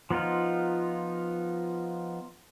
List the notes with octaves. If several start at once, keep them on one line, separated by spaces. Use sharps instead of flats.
F3 B3 D#4 F4